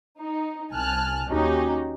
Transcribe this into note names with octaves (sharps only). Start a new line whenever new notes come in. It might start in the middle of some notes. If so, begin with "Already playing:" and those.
D#4
C2 G#5 A5 F6 F#6
D#2 C#4 D#4 F#4 G4